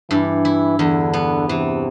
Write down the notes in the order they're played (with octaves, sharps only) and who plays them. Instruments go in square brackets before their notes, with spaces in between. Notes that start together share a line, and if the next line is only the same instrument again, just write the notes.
[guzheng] G2 [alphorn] E3
[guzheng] E4
[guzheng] E2 [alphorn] D3
[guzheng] B3
[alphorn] C3 [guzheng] E3